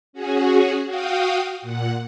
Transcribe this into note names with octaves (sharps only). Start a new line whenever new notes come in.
C#4 F#4 G#4
F#4 F5 G5 D#6
A#2 F#5